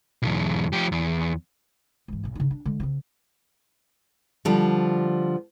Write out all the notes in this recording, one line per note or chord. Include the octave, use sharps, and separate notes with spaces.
B1 E2
F3 G4
E2
G#2 E3
B1 B3
C#3 D#4
D4
D3 G#3
C#3 C4
D3 F3 G3